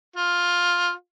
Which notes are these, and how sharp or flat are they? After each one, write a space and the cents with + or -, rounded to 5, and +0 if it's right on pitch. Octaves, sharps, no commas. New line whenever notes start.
F4 +10